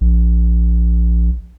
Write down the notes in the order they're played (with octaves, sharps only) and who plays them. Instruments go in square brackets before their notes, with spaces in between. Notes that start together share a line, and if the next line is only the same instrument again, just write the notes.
[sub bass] A#1